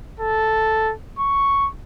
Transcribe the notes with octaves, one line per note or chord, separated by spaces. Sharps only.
A4
C#6